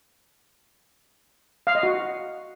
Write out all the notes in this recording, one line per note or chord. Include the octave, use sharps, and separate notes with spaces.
F5
D#5
F#4